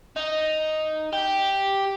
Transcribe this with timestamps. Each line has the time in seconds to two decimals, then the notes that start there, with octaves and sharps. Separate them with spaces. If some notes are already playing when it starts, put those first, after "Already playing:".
0.16 D#4
1.13 G4